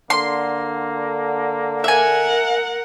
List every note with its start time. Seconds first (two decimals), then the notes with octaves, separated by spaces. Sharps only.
0.10 D3 A#3 C6
1.84 A#4 E5 F#5 G#5